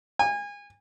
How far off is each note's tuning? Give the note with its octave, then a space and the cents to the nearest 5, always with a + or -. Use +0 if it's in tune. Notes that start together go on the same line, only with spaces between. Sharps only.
G#5 -30